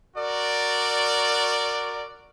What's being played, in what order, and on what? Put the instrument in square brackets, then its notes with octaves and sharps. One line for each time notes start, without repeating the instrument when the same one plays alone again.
[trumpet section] F#4 A#4 D5